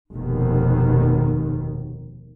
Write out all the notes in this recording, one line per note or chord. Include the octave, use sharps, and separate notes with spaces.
F1 D#2 B2 D#3